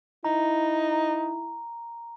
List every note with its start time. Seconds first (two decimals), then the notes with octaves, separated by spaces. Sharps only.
0.25 D#4 E4 A#5